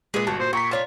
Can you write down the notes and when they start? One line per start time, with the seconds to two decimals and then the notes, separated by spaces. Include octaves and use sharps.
0.14 A#2 G#3 G#4 B4
0.27 G1 F#4 A5
0.40 A#2 C5
0.53 A#2 G5 A#5 C#6 B6
0.71 D4 F4 C#5 A5